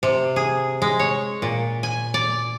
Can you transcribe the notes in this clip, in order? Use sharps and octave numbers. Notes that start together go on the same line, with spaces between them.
C3
G#4
G#3
C#5
A#2
G#5
D5